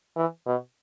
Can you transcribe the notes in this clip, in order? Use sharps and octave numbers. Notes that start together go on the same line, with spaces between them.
E3
B2